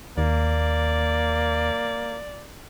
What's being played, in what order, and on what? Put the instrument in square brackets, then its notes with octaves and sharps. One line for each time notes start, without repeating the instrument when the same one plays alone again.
[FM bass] D#2 [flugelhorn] A#3 [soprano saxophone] D5